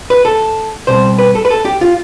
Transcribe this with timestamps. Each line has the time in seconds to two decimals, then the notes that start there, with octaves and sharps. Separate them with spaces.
0.10 B4
0.25 A4
0.87 B2 G3 C4 C5
1.19 B4
1.35 A4
1.45 B4
1.50 A4
1.65 G4
1.81 F4